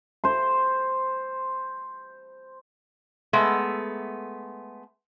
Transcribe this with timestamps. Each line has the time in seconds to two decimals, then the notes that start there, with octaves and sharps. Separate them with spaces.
0.24 C5 C6
3.33 G#3 A3 B3 E5